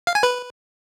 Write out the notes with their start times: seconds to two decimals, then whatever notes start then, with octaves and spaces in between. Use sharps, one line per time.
0.07 F5
0.15 G#5
0.23 B4